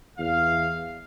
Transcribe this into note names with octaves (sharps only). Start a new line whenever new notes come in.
E2 F5